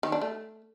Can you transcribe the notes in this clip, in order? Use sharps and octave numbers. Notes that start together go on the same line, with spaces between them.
D#3
D4
A3